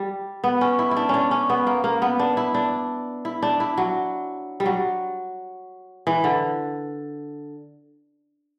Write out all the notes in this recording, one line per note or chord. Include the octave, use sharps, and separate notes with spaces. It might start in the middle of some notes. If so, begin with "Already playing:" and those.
Already playing: G3
B3
C#4
E4
E4
D4
C#4 D4
C#4
B3
A#3
A#3
B3
D4
E4
D4
E4
D4
E4
F#3
G3
F#3
E3
D3